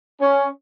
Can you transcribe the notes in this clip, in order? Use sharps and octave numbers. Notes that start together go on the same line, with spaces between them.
C#4